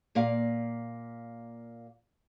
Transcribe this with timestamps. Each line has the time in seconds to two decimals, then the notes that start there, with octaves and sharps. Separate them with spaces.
0.15 A#2 A#3 F5